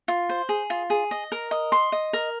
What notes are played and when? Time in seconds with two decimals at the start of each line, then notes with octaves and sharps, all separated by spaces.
0.08 F4
0.29 C5
0.49 G#4
0.70 F4
0.90 G#4
1.11 D#5
1.32 A#4
1.51 D#5
1.72 C6
1.92 D#5
2.13 A#4